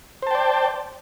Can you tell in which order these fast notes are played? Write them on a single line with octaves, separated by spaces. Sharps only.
C5 A5 G5 D5